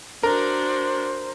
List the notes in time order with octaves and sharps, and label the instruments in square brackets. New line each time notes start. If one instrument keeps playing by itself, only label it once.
[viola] D4 F#4 [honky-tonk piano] A#4 [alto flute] C5